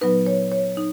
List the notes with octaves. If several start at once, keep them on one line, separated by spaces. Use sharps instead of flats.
A#2 F#3 B3 D#4 B4
C#5
C#5
D#4